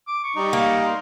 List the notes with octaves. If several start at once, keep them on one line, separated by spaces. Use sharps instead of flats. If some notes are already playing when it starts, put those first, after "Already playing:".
D6
C#6
G3 D#4
A#3
C6